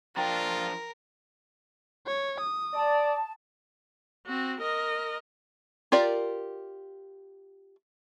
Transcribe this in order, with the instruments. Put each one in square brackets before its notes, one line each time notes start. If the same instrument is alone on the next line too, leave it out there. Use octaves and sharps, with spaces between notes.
[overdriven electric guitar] F3 D4 [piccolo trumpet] F4 [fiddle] A#4 [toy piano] G5 A#5
[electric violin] C#5
D#6
[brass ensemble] D5 [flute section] A5
[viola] C4 F#4
A#4 D#5
[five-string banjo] F4 G4 A#4 D5